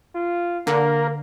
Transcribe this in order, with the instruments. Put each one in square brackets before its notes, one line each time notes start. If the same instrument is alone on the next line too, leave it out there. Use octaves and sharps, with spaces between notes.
[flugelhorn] F4
[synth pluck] D3 [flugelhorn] A#3 [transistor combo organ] A#4